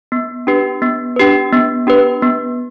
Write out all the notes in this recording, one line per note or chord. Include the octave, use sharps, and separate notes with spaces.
B3
D4 G4 B4
B3
D4 G4 B4
B3
D4 G4 B4
B3